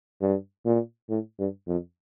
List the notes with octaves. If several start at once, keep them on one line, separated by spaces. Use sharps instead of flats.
G2
A#2
A2
G2
F2